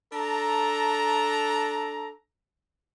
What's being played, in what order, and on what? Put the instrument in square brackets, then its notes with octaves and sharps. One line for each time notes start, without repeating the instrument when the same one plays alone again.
[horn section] D4 A4 A#5